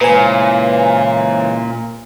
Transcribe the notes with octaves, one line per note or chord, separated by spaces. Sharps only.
A#2 C#3 E3 G#3 B4 C5 G#5